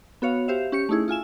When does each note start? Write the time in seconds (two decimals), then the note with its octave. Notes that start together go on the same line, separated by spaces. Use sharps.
0.22 B3 F#4 C#5 F5
0.48 G4 C5 E5 F5
0.72 C#4 G4 C#6 C#7
0.89 A3 C#4 D#4 E4 G#4
1.08 E4 F4 G#5 E7